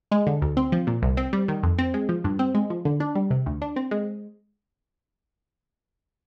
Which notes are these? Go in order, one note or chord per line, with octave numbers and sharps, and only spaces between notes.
G#3
D3
D2
C4
F3
A#2
C2
C4
G3
D#3
F2
C4
G#3
F3
G2
C4
G#3
F3
D3
D4
G3
C3
D2
D4
C4
G#3